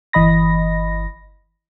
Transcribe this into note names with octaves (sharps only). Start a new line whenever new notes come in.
G1 E3 D#5 B5 A#6